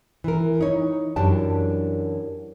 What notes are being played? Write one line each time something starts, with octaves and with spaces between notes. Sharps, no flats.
E3 A#4
D#4 C#5
F#2 E3 D4 G4 A5